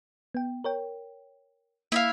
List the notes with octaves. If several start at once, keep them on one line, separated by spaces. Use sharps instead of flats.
B3 G5
A#4 C#5 G5
A#3 E4 E5 F5